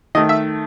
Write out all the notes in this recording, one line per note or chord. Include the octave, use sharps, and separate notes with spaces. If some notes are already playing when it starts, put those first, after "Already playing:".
D#3 A3 D#5
E5